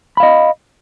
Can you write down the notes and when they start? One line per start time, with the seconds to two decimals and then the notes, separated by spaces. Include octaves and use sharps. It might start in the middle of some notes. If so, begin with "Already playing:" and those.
0.17 B5
0.20 F5
0.23 D#5